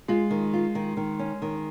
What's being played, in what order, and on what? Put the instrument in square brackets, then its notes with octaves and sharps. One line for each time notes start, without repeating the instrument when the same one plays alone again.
[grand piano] G#3 [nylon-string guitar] F4
[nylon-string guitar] D#3
F4
D#3
D#3
C#4
D#3